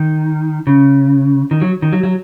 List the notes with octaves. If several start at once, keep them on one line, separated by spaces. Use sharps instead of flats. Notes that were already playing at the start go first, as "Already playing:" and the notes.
Already playing: D#3
C#3
D#3
F#3
D#3
F#3
F#3